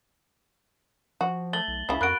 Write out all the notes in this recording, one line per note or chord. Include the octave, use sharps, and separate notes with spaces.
F3 F#4
A3 A6 F#7 G7
B1
C#2 C#3 E4
F2 A#3 F#4 B5 F#6 D7